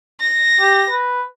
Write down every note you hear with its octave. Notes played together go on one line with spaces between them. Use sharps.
A#6
G4
B4